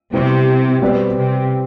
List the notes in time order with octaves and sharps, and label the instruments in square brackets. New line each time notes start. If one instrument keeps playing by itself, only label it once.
[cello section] C3 [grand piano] G3 B3 E4 G4 C5
[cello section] B2 [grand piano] G3 C4 G4 B4 D5
[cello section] C3